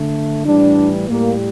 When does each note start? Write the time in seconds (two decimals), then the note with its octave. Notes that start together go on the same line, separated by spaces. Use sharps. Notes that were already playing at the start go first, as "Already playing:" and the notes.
Already playing: D3 A3
0.47 A2 E3 G3 D4
1.09 A2 G3 A#3